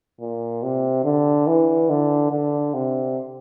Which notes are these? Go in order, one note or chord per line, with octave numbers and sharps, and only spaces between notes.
A#2
C3
D3
E3
D3
D3
C3